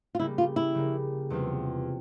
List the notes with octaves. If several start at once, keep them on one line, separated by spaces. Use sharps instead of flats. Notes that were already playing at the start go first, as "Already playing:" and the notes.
F4
C#3 G3 A#3 E4
F4
E4
C#3 G3 A#3
E2 C3 G3 C4 F4